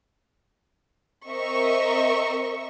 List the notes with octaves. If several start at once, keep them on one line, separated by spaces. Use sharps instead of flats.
C4 A#4 D#5 E5 C#6